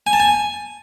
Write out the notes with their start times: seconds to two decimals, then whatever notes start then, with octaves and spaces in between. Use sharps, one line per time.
0.07 G#5
0.13 A5
0.20 G#5